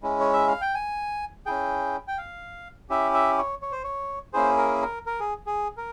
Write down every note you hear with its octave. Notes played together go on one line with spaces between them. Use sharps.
G#3 C#4 E4
C#5
E5
F5
G5
G#5
C#4 E4 G#4 G5
G5
F5
C#4 E4 G4 E5
E5
C#5
C#5
C5
C#5
A#3 C#4 E4 G#4 C5
A#4
A#4
A#4
G#4
G#4
A#4